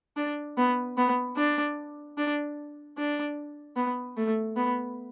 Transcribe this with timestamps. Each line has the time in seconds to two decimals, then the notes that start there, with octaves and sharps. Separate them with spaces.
0.16 D4
0.57 B3
0.97 B3
1.36 D4
2.18 D4
2.97 D4
3.76 B3
4.17 A3
4.56 B3